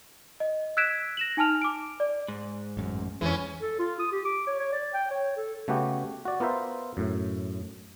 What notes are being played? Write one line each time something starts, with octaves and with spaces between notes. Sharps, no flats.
D#5
E6 F#6 G#6 B6 D7 E7
A#6 E7 F#7
D#4 G#5 A5 F6 F7
D6 D7
D5
G#2
A1 F#2
F2 E3 G#3 C#4
A4
F4
D#6
G4
D6
C#5
C#5
D5
G5
C#5
A4
C#3 A3 B3 F#4 G4
F#4 D5
B3 F4 A#4 C5 E5
F#2 A2